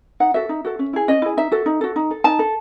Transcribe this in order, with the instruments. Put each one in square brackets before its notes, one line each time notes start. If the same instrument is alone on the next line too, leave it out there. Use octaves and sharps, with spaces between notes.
[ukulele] D#4 F#5
F#4 A4 E5
D#4
F#4 A4
C#4
E4 G#4
C#4 D#5
E4 G#4
D#4 E5
F#4 A4
D#4
F#4 A4
D#4
A4
D#4 A5
A4